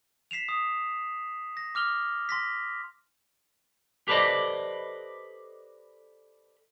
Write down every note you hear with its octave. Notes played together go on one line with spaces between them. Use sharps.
B6 C7 E7 F7
D#6
A#6
D6 F6 F7 G7
C6 A#6 B6
G4 A4 B4 C5 D5 D#5